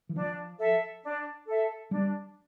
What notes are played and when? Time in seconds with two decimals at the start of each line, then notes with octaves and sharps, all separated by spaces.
0.09 E3
0.15 F3 D4
0.59 A4 E5
1.03 D4
1.47 A4 E5
1.91 G3 D4